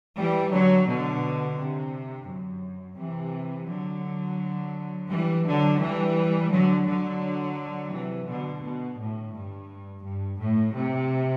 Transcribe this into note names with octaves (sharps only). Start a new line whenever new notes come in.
E3 G3
D3 F#3
B2 D3
C3
F#2
C3 E3
D3 F#3
E3 G3
D3 F#3
E3 G3
D3 F#3
D3 F#3
C3 E3
B2 D3
B2
A2
G2
G2
A2
C3